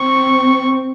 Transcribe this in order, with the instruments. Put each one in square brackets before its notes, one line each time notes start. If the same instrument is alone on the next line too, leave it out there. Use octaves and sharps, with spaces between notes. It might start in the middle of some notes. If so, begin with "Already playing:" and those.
Already playing: [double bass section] C4 [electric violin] C#6